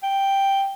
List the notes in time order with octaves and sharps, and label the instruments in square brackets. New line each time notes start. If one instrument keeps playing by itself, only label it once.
[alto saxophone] G5